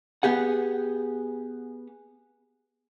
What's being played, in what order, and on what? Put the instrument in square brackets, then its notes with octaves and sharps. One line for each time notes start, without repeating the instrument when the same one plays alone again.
[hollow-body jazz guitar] B3 G4 G#4 F#5